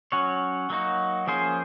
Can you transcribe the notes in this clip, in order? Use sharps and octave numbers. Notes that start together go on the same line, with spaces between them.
F#3 C#4 F#4 C#5
F#3 A#3 D#4 F#4
F3 A#3 C#4 G#4 C5